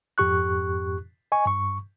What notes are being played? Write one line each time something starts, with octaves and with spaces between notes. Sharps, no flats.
F2 G#2 G4 C#6 F#6
D#5 G#5 C#6
G2 C#6